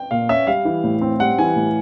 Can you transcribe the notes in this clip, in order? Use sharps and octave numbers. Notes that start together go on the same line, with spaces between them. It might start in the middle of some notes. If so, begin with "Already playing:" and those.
Already playing: G5
A#2 F5
C#4 E5
G3 F5
E3
A2
C4
G3 F#5
E3 G#5
A2